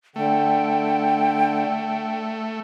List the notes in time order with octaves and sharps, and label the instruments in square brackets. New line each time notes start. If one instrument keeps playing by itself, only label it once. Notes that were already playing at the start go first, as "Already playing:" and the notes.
[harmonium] D3 [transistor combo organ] A3 [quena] G5